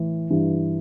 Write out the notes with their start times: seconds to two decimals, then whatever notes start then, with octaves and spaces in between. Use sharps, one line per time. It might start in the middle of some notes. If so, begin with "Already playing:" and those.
Already playing: A2 E3
0.30 G2 E3